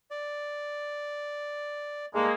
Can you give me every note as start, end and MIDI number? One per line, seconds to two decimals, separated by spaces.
0.11 2.06 74
2.14 2.27 43
2.14 2.33 56
2.14 2.33 58
2.14 2.27 63
2.14 2.27 69